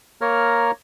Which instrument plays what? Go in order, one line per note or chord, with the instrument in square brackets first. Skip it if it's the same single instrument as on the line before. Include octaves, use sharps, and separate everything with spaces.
[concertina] A#3 A#4 C#5 A#5 F6